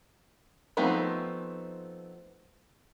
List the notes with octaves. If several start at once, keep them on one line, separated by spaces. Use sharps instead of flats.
F3 A3 B3 C4 D#4